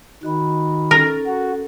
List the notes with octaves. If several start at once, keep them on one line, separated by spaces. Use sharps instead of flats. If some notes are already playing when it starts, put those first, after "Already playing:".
D#3 F#4 D#5 B5
C#4 A4 A#4
F#4